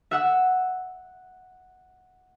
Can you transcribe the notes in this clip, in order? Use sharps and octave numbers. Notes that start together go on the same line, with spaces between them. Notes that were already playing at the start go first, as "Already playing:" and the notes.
E5 F#5 E6